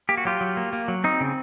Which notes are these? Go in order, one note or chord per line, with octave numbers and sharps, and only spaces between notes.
A#3 G4
F#4
F#3 F4 G4
F#3
A#3
A#3
F#3
C4 D#4
C#3